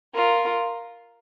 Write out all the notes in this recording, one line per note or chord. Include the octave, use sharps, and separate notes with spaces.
F4 A#4